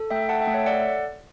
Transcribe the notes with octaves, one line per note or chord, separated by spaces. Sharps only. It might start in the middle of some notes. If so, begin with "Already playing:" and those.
Already playing: A4
A3 E5 G5
A4 F#5 A5
E5 G5
A3
C#5 E5
A4 D5 F#5